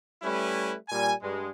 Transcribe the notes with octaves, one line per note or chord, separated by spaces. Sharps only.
G3 A3 C#4 E4 B4
A#2 G3 G#5
G2 G#3